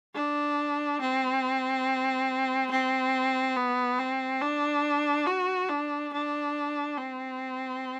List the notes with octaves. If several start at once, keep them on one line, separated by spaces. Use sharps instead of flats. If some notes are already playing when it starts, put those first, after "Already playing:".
D4
C4
C4
B3
C4
D4
F#4
D4
D4
C4